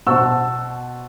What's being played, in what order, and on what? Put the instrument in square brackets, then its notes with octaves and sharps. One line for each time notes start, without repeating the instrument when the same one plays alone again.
[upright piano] B2 C5 F#5 A5 C#6 E6